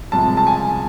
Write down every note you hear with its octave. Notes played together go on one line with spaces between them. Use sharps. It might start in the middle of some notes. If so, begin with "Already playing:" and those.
C2 C3 F3 G#3 A5
A5
G#5